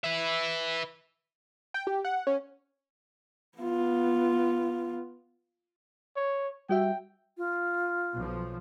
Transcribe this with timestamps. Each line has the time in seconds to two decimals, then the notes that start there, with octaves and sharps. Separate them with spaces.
0.04 B4 E5
1.74 G5
1.87 G4
2.05 F#5
2.27 C#4
3.58 B3 F4
6.16 C#5
6.69 G3 F#4 E5 G5
7.37 F4
8.15 B1 F3